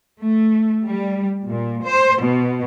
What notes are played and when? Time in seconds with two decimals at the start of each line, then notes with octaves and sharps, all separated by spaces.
0.21 A3
0.84 G3
1.47 A#2
1.83 C5
2.21 B2